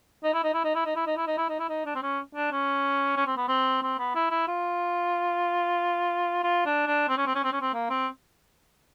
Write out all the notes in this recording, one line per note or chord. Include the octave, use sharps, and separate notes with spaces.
D#4
E4
D#4
E4
D#4
E4
D#4
E4
D#4
E4
D#4
E4
D#4
E4
D#4
D4
C4
C#4
D4
C#4
C#4
C4
B3
C4
C4
B3
E4
E4
F4
F4
D4
D4
C4
C#4
C4
C#4
C4
C#4
C4
A#3
C4